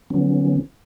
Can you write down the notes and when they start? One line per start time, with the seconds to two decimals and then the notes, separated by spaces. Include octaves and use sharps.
0.10 D3 D#3 F3 F#3 B3 C#4